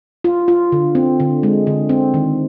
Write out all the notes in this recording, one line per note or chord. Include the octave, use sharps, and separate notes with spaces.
F4
F4
D3
C4
D3
G#3
D3
C4
D#3